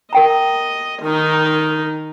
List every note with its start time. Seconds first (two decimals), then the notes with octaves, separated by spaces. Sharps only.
0.13 A#4 D#5 G5 A#5
1.02 D#3 D#4